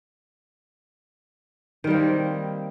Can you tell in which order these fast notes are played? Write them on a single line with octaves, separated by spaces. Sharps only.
D#3 G3 A#3 C4